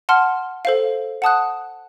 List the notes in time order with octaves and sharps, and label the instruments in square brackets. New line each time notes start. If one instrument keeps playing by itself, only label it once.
[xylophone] F#5 A5 C6 F6
A4 C5 F5
F#5 A5 D#6 F#6